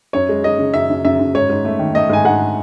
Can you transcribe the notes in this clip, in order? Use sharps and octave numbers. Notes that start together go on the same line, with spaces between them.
F#2 C#5
G#3
G#3 D#5
C#3
F#2 E5
F#2
F#2 E5
F#2
G#2 C#5
G#2
A3
D#3
A3 D#5
G#2 G#5
G#2 F#5